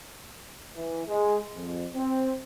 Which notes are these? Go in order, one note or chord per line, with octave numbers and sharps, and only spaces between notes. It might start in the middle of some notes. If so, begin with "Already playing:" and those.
E3
G#3
F2
C4